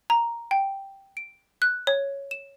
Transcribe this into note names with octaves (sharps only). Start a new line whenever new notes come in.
A#5
G5
D7
F#6
C#5
E7